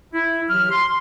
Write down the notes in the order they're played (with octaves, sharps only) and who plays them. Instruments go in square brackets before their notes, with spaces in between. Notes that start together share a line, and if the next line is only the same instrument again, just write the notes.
[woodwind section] E4
E3 F#3 G4 F6
C6